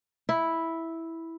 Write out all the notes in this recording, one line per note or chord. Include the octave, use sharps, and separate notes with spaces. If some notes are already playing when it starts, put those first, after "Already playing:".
E4